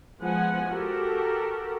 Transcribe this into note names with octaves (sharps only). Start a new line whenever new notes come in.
F3 G#3 B3 F#5 G#5
F#4 G4 A4 A#4